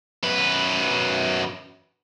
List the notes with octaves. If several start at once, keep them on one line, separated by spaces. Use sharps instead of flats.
F#2 B4